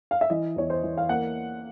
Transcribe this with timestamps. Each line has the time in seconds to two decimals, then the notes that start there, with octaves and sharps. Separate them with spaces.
0.11 F5
0.21 E5
0.30 E3 D#5
0.56 E2 C#5
0.70 C5
0.83 E3
0.98 F5
1.09 A#3 F#5